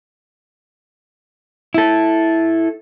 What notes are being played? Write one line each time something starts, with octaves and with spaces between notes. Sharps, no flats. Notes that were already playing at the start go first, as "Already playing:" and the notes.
E4 A4